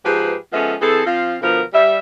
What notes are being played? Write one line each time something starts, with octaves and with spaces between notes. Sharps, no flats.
G#2 F3 G4 G#4 B4
F3 G#3 B3 C#4 A4 E5
E3 C4 G#4 A4
F3 C4 F4 F5
B2 D3 F3 B3 A#4
G3 E5